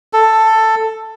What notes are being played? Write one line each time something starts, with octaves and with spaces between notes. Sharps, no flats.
A4